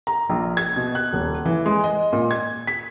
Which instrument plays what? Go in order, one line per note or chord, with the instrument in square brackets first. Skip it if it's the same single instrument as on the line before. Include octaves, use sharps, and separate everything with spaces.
[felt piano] A#5
A#1
G#6
B2
F#6
D#1
E3
G#3
D#5
A#2
G#6
B6